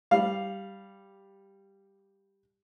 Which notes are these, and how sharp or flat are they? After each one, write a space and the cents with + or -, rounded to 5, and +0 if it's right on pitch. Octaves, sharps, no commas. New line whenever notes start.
G3 +0 F5 +0